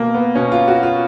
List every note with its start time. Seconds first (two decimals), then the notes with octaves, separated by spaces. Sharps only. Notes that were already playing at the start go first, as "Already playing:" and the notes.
Already playing: B2 A#3
0.14 B3
0.35 B2 C#4
0.52 F4
0.68 F#4
0.83 F4